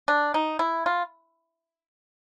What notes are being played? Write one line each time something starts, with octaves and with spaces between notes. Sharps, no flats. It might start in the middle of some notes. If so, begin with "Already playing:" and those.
D4
D#4
E4
F4